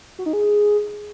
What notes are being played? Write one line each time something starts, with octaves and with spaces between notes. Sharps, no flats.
F#4
D#4
G#4